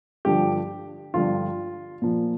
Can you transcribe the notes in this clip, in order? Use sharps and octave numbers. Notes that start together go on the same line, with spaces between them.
G2 D3 F3 G4
G2 D3 F3 F4
A#2 F3